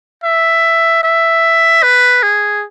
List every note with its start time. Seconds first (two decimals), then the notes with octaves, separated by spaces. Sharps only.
0.24 E5
1.03 E5
1.83 B4
2.23 G#4